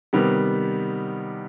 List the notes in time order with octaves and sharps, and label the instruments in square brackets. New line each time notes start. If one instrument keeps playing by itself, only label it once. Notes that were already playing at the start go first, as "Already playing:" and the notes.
[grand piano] C3 D#3 G3 B3